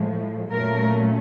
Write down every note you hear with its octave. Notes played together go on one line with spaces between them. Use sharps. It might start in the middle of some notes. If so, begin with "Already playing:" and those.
Already playing: A2 F3 G#3
A#2 F#3 A3 C#4 A#4